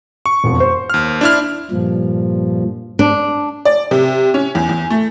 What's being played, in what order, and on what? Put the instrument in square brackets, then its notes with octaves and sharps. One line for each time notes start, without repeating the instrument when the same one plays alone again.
[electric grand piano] C#6
[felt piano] E1 F2
C5
[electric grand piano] D#2 F6
D4 E4 F6
[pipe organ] G2 A#2 F3
[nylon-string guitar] D4
[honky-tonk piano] D5
C3
C#4
E2
E2
A3